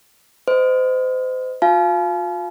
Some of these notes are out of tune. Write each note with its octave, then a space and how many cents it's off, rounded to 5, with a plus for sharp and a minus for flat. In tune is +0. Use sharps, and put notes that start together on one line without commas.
C5 -35 D#5 +0
F4 +40 F5 -20 A5 -45